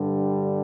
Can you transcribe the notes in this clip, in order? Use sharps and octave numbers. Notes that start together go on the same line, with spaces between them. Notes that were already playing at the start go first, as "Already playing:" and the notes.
Already playing: G2 D3 G3